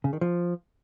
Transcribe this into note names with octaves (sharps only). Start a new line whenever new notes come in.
C#3
D#3
F3